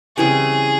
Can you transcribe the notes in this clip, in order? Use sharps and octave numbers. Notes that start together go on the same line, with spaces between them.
C#3 E3 G3 C4 G#4